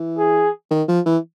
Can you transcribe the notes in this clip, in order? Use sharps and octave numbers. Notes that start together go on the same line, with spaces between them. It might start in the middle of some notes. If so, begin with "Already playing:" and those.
Already playing: E3
G#4
D#3
F3
E3